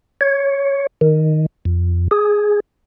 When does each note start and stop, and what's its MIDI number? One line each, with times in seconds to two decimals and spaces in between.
0.21 0.87 73
1.01 1.46 51
1.65 2.08 41
2.11 2.60 68